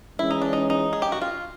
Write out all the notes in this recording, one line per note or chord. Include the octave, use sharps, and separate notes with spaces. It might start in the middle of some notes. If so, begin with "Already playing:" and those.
E3 G#3 C#4 E4
D#4
D4
D#4
D#4
G#4
G4
F#4
F4